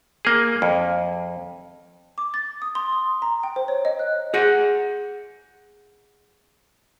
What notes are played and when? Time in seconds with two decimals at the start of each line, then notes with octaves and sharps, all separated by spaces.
0.25 A#3 G#4
0.62 F2
2.18 D6
2.34 A6
2.62 D#6
2.75 C6
2.92 D#6
3.22 A#5
3.43 G5
3.56 C5
3.68 C#5
3.85 D#5
3.99 F#6
4.34 G#4 F#5